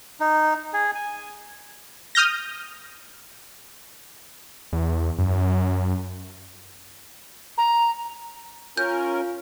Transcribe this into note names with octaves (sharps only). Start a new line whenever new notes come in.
D#4
G#4
G#5
D#6 F6 G6 A#6
E2
F#2
A#5
C#4 F4 A#4 G6